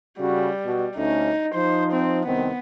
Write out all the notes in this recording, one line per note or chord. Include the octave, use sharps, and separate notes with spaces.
C#3 G3 C#4 F#4
B2
D2 A3 C#4 D#4
F3 D#4 C5
C4
C2 D#3 B3 C4